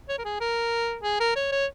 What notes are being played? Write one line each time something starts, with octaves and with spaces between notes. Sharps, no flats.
C#5
A#4
G#4
A#4
G#4
A#4
C#5
C#5